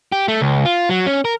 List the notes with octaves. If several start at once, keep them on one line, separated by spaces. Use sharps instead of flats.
G4
A3
C#2
F4
F#3
C#4
A#4